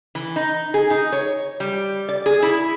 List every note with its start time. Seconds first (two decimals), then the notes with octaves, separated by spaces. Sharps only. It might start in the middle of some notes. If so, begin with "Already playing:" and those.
0.15 E3
0.36 D#4
0.74 G#4
0.90 D#4
1.13 C#5
1.60 G3
2.09 D5
2.26 G#4
2.42 E4